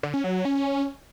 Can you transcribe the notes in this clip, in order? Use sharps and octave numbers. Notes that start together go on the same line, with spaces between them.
D3
C#4
F#3
F#3
C#4